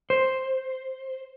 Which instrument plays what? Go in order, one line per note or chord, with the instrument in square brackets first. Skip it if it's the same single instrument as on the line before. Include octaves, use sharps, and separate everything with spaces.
[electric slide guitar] C5